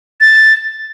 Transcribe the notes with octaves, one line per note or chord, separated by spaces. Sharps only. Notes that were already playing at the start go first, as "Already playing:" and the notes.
A6